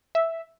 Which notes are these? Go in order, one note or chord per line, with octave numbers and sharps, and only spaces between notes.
E5